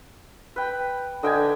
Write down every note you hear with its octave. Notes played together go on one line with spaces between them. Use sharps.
B4 G5
D3 D#5 G5 G#5